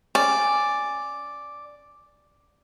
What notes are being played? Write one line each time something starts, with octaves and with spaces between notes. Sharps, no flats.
C#4 D5